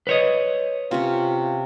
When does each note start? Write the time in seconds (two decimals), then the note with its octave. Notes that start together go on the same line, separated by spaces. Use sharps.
0.07 B4 C#5 D#5
0.91 C3 C#4 F4